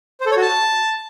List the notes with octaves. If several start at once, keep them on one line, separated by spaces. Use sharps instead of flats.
C5
A4
C#5
F#4
A5